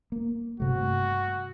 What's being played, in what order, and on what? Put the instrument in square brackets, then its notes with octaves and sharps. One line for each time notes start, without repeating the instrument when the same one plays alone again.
[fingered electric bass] A#3
[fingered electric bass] G2 C3 A3 [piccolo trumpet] F#4